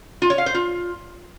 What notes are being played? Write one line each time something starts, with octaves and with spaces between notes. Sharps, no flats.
F4
C#5
F5
C5
F4